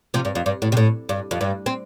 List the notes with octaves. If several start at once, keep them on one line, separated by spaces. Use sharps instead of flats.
C3 F3
G2
F2
G2
A2
C3
A2
G2
F2
G2
C4